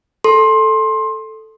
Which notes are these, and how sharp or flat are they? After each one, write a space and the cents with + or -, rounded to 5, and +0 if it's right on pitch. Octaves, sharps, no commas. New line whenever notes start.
A4 +0 C6 +20